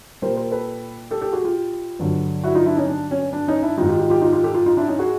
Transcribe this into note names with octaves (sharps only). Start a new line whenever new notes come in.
A#2 G3 A#4 C5
A#4 C5
A4 B4
G4 A4
G4 A4
F#4 G#4
F4 G4
G2 D3 F#3
E4 F#4
D#4 F4
D4 E4
C#4 D#4
D4
C#4
D4
C#4 D#4
D4 E4
G#2 D#3 G3 D#4 F4
F4 G4
F4 G4
F4 G4
D#4 F4
F4 G4
G4 A4
F4 G4
D#4 F4
D4 E4
C#4 D#4
F#4 G#4